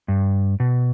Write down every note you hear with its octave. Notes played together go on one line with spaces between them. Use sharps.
G2
B2